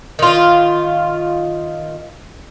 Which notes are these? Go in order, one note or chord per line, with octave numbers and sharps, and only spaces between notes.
D#3 F4